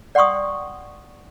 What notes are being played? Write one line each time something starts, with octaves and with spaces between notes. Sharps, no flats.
D5 F#5 G5 C6 C#6 D#6